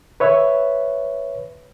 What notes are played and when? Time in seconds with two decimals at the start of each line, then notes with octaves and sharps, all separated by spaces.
0.20 B4 C#5 E5